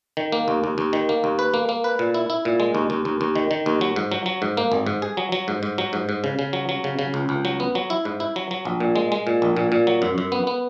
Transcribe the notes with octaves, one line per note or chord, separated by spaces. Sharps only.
D#3
A#3
D#2
D#2
D#2
D#3
A#3
D#2
B4
A#3
A#3
B4
A#2
E4
E4
A#2
G#3
D#2
D#2
D#2
D#2
D#3
D#3
D#2
F#3
G#2
F#3
F#3
G#2
A#3
G#1
G#2
G#4
F#3
F#3
G#2
G#2
F#3
G#2
G#2
C#3
C#3
F#3
F#3
C#3
C#3
C#2
C#2
F#3
B3
F#3
E4
G#2
E4
F#3
F#3
A#1
A#2
G#3
G#3
A#2
A#1
A#2
A#2
F#3
F#2
F#2
B3
B3